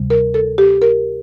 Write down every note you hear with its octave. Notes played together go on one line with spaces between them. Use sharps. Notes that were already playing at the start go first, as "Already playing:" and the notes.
Already playing: D2 C3 G3
A#4
A4
G4
A#4